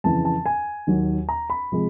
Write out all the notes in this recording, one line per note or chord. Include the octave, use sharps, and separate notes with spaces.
F2 C#3 E3 A5
A5
G#5
D#2 D#3 F#3
A#5
B5
C3 F3 G#3